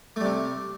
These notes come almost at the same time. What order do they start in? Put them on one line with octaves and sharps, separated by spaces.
A3 G3 C3